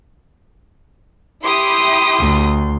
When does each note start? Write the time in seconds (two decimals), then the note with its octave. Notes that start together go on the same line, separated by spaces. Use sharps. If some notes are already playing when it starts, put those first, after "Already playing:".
1.43 E4 G4 C6 D#6
2.19 D2